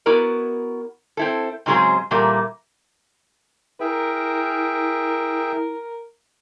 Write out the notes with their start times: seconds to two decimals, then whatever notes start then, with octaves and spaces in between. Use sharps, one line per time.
0.06 B3 E4 F#4 A#4 D5
1.17 C4 E4 A4
1.66 G#2 C#3 F#3 G#3 C4 G#4
2.11 A#2 E3 G3 A3 A#3
3.80 E4 G#4 A#4 E5 G5